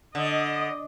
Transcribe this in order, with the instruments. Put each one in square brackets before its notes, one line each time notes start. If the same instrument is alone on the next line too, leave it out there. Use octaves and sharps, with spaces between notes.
[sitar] D3 [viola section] D#5